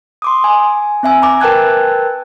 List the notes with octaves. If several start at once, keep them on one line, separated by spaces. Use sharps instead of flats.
C6 D6 D#6
G#5
C4 E5 G#5 E6
A#5 D6
A#4 B4 G5 A5 F#6 G#6